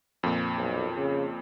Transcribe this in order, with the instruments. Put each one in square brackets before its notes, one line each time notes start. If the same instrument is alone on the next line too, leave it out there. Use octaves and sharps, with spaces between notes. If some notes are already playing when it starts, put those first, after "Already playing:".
[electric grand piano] F2 A#2
[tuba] B1
C#3